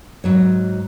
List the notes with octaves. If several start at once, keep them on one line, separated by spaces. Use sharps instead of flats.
G#2 F#3 C#5